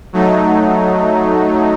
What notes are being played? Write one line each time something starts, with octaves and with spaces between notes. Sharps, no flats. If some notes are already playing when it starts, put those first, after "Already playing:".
F#3 A3 D#4